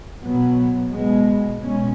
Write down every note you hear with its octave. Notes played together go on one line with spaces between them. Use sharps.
B2 F#3 B3
B2 G#3 B3
B2 G#3 C#4